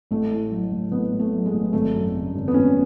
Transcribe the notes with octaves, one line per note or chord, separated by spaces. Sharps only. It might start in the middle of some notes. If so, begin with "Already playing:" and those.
A1 A3
A2
F#3
A1
A1 B3
A2
A3
F#3
G#3
A1
G#1 A3
F#2
C#3
G#1
B3
G#1 C#4